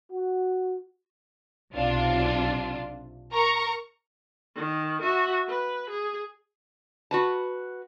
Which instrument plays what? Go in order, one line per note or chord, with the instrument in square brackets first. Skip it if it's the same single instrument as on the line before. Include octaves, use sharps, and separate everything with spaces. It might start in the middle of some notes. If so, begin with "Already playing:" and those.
[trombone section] F#4
[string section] B1 C3 D4 F4
A#4 A#5 C#6
[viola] D#3
F#4 E5
B4
G#4
[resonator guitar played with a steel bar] F#4 B4 A5